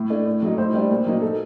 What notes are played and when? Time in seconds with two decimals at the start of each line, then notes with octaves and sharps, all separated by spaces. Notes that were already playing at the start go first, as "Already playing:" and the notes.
Already playing: A2
0.10 A3 D4
0.26 A2
0.42 F#3 A3 D#4
0.58 A2 C5
0.74 G3 D4
0.91 A#2
1.06 F#3 A#3 D#4
1.22 A4